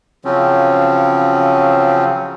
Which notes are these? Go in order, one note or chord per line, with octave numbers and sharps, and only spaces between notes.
C#3 F3 F#3 C4 C#4